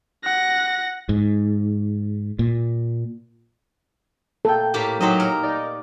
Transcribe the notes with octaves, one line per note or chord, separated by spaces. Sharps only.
F#5 A#6
G#2
A#2
A#2 A4 G5
A2 A#3 G4
F#3 D#4 G4 C5 D#5
A#4
D#4 D5